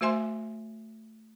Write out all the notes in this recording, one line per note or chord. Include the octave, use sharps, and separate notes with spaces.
A3 F#4 C5 E5 G#5 C6